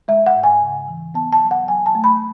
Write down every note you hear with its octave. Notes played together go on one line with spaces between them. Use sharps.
G#3 E5
F#5
G#2
G#5
C#3
E3
B3 A5
A5
F#3
F#5
F#3 G#5
A5
A3
B5